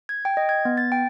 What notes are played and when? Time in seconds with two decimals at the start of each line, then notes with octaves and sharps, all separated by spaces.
0.09 G#6
0.25 G5
0.37 D#5
0.49 G#6
0.65 B3
0.77 A6
0.92 G5